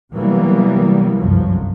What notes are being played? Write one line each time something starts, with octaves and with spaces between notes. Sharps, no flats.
C3 E3 F#3 G3 A#3 B3
G1 C2 F#2 F3 F#3